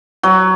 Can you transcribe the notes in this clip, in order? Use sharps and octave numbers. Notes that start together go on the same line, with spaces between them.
F#3